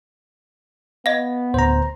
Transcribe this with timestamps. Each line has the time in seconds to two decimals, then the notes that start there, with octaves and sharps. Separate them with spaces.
1.06 B3 D#5 F5
1.54 D1 D2 C5 A#5